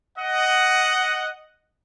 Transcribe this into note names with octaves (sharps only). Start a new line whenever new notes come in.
D#5 F#5